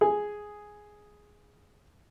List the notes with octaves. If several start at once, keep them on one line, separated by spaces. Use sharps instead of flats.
G#4 G#5